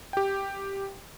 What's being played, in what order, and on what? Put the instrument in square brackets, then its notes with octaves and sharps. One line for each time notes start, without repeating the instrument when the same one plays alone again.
[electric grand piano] G4 G5